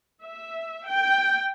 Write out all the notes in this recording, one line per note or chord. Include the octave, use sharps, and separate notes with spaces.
E5
G5